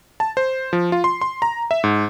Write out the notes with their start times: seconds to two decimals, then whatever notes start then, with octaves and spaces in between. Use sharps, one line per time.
0.20 A5
0.37 C5
0.73 F3
0.92 F4
1.04 C6
1.21 C6
1.42 A#5
1.71 E5
1.84 G#2